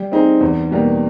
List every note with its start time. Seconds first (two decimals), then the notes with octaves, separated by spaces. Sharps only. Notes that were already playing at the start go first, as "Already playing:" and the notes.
Already playing: G3
0.12 C4 D#4 G#4
0.41 E2
0.71 B2 G3 A#3